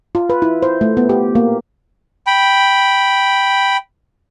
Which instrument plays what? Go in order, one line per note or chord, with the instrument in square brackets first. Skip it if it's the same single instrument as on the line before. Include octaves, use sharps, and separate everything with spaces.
[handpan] F4
B4
E4
C5
A3
B3
G4
A#3
[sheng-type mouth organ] G5 B5